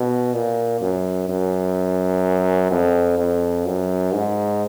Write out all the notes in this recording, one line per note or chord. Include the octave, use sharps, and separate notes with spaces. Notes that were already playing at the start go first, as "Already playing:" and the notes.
Already playing: B2
A#2
F#2
F#2
F2
F2
F#2
G#2